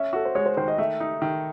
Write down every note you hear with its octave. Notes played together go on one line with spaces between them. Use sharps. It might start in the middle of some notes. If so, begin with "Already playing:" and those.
Already playing: C#4 E5
F#4 A4
C5
G#3 C#5
C5
D#3 C5
D#5
A3 E5
D#4
D#3